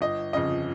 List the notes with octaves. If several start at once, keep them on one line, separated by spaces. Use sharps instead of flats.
G1 D#5
F2 C#3 D#5